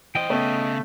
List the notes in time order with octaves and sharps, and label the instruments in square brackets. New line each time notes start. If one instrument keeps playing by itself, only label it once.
[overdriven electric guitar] E3 C5 [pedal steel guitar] D#5 G5
[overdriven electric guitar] C#3 [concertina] A3 [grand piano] B3 C#5